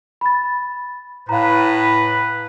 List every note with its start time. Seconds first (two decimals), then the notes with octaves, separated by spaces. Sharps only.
0.21 B5 A6
1.29 A2 B4 F5 A#5